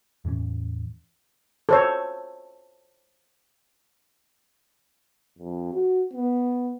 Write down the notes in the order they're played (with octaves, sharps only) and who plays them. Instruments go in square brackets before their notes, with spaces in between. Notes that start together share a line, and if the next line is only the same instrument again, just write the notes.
[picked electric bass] E2 A2 E3 C#4
[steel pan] A4 C5 C#5
[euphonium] F2
F#4
B3